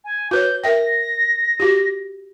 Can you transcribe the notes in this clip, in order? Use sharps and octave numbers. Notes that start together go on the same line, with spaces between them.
G#5
F#4 B4 C#5 G6
A#4 E5 G5 A#6
F#4 G4